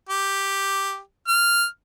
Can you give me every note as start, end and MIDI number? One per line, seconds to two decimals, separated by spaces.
0.09 0.99 67
1.28 1.65 89